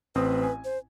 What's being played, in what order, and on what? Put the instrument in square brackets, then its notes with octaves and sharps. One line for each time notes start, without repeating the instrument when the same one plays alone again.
[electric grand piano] A1 C4 D#6 [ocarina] B4
[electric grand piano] G#5
[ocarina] C5